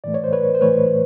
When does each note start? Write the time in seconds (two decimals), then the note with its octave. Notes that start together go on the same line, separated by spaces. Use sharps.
0.04 A2 E3 A3 D5
0.14 C#5
0.24 C5
0.33 B4 C#5
0.55 C5
0.61 A2 E3 A3 B4 C#5